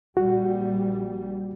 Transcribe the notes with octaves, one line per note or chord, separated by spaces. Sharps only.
A#1 G3 F#4